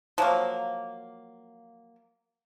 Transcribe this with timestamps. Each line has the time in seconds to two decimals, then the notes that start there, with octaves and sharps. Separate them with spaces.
0.18 F3 F#3 A#3